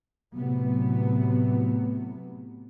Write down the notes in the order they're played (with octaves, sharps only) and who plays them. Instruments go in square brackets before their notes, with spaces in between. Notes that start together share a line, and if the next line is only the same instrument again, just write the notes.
[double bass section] A2 C3 F#3 B3